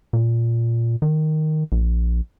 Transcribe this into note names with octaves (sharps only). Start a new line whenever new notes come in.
A#2
D#3
A#1